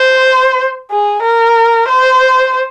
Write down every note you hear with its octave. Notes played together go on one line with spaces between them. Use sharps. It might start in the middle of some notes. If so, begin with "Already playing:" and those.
Already playing: C5
G#4
A#4
C5